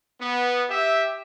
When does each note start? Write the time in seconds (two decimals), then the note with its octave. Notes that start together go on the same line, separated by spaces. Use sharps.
0.20 B3
0.69 G4 E5